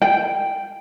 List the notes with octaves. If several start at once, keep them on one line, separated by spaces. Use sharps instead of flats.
G5